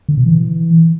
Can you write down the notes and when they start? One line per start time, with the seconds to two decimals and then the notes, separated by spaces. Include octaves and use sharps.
0.09 D3
0.17 B2
0.26 E3